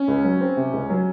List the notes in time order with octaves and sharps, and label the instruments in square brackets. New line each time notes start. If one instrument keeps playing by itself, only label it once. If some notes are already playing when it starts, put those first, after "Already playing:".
Already playing: [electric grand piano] C#4
[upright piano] C#2
F#3
C4
C3
C#2
F#3